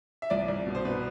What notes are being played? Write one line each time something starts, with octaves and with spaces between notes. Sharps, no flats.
E5
C2 D5
C2
B2
C5
B2 B4